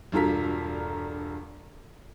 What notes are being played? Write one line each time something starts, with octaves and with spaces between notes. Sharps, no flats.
E1 G2 F4 A4 A#5 B6